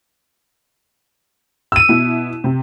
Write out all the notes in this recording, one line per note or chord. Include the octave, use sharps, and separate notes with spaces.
E6 D#7
B2 E4
C3